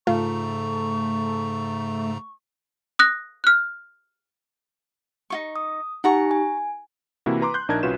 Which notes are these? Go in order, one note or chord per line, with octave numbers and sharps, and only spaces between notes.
G#2 C#3 A3 F4 A#5 C#6
D#6 F#6 A#6
F6 F#6
D#4 F4 C#6
D#6
D#4 G4 F#5 G#5 A#5 C#6
G#5
C3 E3 A#3 E4 F#4
B4 A#5 C6 D6
C6 F#6 G6
A#1 D4 D#4 A#4 A5 G#6
C2 C#4 F4 F#4 B4 E7